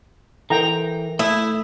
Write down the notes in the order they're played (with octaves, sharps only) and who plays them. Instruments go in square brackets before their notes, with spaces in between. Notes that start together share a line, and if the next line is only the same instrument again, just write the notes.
[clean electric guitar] E3 [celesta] A4 A#4 [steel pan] G5 A#5
[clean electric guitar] A3 [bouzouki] E4 [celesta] D#6